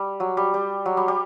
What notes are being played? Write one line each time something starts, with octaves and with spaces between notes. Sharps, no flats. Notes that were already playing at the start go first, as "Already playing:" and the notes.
Already playing: G3
F#3
G3
G3
F#3
G3
G3